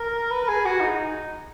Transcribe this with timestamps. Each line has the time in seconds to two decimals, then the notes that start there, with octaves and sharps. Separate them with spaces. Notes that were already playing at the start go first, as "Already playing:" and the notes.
Already playing: A#4
0.31 B4
0.48 G#4
0.65 F#4
0.80 D#4